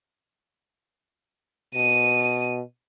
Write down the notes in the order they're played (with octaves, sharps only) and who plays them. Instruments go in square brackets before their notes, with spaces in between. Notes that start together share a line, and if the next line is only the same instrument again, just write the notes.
[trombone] B2 [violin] D#7